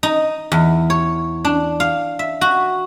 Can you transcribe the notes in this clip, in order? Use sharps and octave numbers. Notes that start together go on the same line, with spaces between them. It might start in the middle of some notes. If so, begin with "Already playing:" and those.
D#4
E2
C#5
D4
F5
E5
F#4